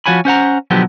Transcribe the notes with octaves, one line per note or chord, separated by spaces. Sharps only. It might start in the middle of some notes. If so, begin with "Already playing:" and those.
F3 F#4 C#5 G#5 B5
C#4 C5 F#5 A#5
B2 D3 F3 F#3 B3 G4